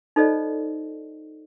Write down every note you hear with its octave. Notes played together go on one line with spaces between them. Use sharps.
D#4 F4 A4 C5 D5 D#5